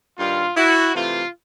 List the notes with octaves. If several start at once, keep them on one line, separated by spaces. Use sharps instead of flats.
G2 D#3 G3 F4
E4 F#4
C3 E3 A3 F4